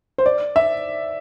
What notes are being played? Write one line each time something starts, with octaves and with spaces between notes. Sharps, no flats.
C5
D5
E5